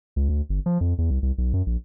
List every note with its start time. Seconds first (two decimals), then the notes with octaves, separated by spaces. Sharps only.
0.16 C#2
0.29 D2
0.49 G1
0.66 F3
0.81 F2
0.98 E2
1.10 C2
1.22 C2
1.38 B1
1.53 F#2
1.66 A#1